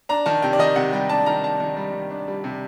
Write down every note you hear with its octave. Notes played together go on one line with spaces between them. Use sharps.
D4 A#5
D#3 A5
C3 G5
D5
D#3 D#5
C3 F#5
G3 G5
D4 A5
D#3 A#5
D4 A5
D#3
G3
D#3
D4
G3
C3